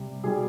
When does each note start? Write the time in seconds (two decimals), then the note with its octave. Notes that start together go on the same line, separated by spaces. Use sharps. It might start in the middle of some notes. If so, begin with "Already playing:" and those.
Already playing: C3 G3
0.24 B2 G3 G#4